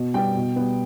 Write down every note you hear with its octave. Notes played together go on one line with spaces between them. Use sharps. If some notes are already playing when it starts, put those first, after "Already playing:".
Already playing: B2
G3 B3 G5
B2
G3 B3